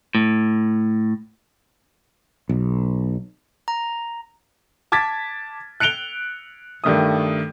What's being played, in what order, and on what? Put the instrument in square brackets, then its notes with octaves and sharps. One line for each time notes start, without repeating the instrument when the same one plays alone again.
[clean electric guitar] A2
[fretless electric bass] B1
[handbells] A#5
[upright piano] A5 D6 G#6 A6 B6
F#6 C#7 D7 F7 G7
G2 D#3 A3 D#6